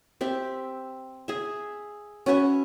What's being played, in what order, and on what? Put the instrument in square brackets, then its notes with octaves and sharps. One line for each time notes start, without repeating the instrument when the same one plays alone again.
[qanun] C4 G4 E5
G#4 E5
C#4 F#4 B4 E5